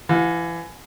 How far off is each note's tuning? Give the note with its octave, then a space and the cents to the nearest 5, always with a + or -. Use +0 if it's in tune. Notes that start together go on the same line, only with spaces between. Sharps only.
E3 +30 F#5 -45